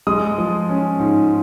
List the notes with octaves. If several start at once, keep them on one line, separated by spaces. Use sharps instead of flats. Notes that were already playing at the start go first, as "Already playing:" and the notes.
G#3 D#6
F3
C#4
G#2